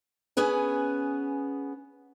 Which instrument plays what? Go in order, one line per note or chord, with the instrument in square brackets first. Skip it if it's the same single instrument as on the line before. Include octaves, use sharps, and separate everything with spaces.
[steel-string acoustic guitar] B3 C#4 G#4 B4 G#5